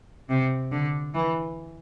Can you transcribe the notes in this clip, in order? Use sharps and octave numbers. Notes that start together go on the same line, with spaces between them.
C3
D3
E3